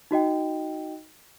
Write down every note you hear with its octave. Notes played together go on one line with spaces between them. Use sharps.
D#4 F#4 D#5 G5